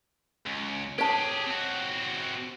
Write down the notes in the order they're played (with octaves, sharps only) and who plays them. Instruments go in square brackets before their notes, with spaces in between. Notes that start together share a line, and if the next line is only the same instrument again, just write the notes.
[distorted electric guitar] C#2
[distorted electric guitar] G4 G#4 [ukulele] C#5 A5
[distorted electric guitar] C4 F#4